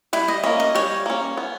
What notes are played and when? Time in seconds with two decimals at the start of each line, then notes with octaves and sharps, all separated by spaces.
0.13 G3 E4
0.28 D#5
0.44 A#3 C#4 D#5
0.60 D#5
0.75 G3 C#5
1.06 A#3 C#4
1.37 B3